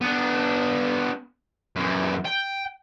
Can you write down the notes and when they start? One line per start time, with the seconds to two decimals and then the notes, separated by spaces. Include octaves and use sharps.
0.01 B3 D4
1.76 F#2 E3
2.25 G5